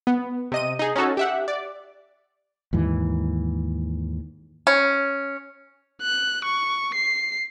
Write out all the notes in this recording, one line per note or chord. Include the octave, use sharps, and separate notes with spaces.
B3
C3 D#5 D#7
D#4 G#4
C#4 D#4 F#4 A4
G4 E5 F#5
D5
D#2 G#2 E3
C#4
F#6
C#6
C7